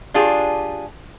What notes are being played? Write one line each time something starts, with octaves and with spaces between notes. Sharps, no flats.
D4 F4 G4 G#4